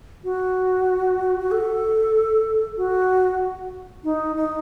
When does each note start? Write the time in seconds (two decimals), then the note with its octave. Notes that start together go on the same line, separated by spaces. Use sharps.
0.24 F#4
1.39 F#4
1.51 A4
2.77 F#4
4.04 D#4
4.36 D#4